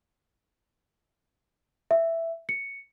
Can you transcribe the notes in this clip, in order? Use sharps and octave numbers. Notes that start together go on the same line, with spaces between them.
E5
C#7